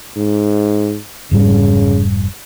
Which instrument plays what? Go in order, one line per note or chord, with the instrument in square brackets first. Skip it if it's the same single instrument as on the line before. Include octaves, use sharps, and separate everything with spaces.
[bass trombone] G#2
[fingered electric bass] F1 G#2 G3 [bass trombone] C#3